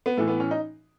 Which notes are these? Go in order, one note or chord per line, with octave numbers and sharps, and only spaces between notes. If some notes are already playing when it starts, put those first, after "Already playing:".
B3
A2 E3 A3
B3
C#4
D#4